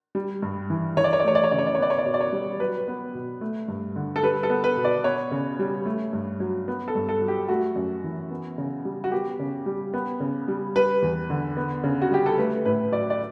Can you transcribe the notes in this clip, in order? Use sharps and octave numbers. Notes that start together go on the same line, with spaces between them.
G3
G2
E3
E3 C#5
D5
C#5
D5
A3 C#5
D5
C#5
C#3 D5
C#5
D5
C#5
B3 D5
C#5
D5
B2 C#5
D5
C#5
G3
F#3 B4
B3
B2
A3
G2
D3
A4
G3 B4
A4
B3
B4
B2
D5
B3 C#5
C#3
G3
A3
G2
F#3
B3
A4
G2
A4
F#3
G4
A3 F#4
F#2
E3
B3
C#3
G3
F#4
B3 G4
C#3
G3
B3
C#3
G3
G3 B4
E2
D3
B3
C#3
F#4
G3 G4
A4
A3 B4
A2 B4
F#3 D5
D5